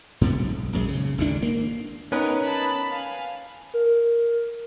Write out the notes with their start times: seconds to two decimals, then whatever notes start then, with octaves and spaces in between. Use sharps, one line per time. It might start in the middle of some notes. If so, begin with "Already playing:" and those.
0.21 G2 C3 B3
0.36 B1
0.73 A#1 F#2 D#3 G#3
0.88 C#3
1.18 G#1 D2 B2 D4
1.42 A#3
2.12 B3 C#4 D#4 A#4 B4 C#5
2.44 A5 B5
2.90 F5 G#5
3.74 A#4